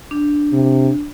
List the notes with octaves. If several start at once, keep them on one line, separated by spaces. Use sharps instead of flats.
D4
C3